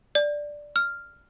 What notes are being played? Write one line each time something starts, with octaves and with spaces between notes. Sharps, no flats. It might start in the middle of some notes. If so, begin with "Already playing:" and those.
D5
F6